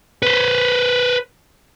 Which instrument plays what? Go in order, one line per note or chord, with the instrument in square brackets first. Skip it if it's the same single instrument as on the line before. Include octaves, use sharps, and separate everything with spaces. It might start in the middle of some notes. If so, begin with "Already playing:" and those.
[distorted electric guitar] B4 C5